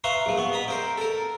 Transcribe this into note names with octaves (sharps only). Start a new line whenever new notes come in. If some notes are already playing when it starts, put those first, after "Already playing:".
B4 E5 F5 A#5 C6 C#6
A#1 F3
B3 C#6
D#5 A#5 B5
C4 A#4 C5
A4 A#4